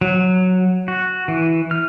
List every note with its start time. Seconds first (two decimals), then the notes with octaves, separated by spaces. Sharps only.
0.01 F#3
0.88 F#4
1.28 E3
1.71 F6